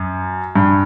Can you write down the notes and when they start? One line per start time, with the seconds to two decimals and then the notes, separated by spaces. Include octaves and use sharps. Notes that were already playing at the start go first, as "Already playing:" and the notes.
Already playing: F#2
0.56 G2